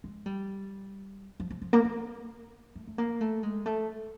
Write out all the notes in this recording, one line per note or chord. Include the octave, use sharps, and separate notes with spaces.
G#3
G3
F3
F3
F3
A#3
B3
A3
A3
A#3
A3
G#3
A3